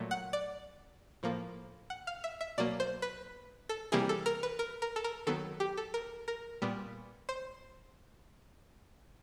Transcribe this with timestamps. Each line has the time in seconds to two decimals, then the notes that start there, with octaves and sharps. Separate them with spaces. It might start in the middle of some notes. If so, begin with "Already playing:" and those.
Already playing: A#2 F#3 A3
0.11 F#5
0.33 D5
1.23 A2 F3 A#3
1.90 F#5
2.07 F5
2.24 E5
2.41 E5
2.58 B2 F#3 A#3 D5
2.80 C5
3.02 B4
3.69 A4
3.92 C3 E3 G3 A#3 G#4
4.09 A4
4.26 A#4
4.43 B4
4.59 A#4
4.82 A#4
4.96 A4
5.04 A#4
5.27 D#3 F#3 B3 A4
5.60 G4
5.77 A4
5.94 A#4
6.28 A#4
6.62 A#2 G3 B3
7.29 C5